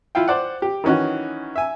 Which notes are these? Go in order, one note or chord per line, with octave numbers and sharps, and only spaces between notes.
E4 F4 F5 G5
C5 D5 F#5
G4
D#3 E3 C#4 D#4 F#4
E5 G#5